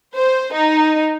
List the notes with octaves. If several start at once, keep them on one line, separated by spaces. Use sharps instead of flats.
C5
D#4